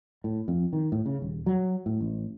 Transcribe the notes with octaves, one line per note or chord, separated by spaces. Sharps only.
A2
F2
D#3
A2
C#3
D#1
F#3
A2
A1